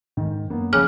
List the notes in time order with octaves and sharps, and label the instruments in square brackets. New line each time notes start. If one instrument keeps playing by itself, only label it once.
[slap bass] G#2 [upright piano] D#3
[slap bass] F#2 [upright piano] A#3 B3
[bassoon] C#3 [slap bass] F3 G3 [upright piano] G#5 D6 F#6 [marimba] F6